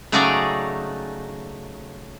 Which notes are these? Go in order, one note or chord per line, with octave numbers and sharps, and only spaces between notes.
C#3 F#3 A3 D#4 G#4 D5